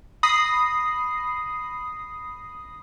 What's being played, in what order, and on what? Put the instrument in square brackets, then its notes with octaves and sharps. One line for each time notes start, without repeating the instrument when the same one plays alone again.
[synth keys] B5 D#6 A#6 C7